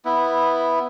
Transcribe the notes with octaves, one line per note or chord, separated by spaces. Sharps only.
B3 E4